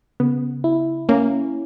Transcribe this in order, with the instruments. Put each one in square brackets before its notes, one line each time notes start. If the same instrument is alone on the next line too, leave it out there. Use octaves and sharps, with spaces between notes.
[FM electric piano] C#3 [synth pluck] B3
[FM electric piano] E4
[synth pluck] A#3 [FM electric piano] C#4